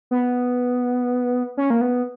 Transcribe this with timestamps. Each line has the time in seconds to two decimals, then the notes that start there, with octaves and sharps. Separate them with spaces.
0.11 B3
1.57 C#4
1.70 A#3
1.81 B3